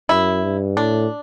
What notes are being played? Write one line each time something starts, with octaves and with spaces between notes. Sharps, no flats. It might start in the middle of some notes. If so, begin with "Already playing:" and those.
F#2 E4
G2
A2 D4